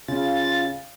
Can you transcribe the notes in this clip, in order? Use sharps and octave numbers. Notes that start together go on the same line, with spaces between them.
C#3 F4 A6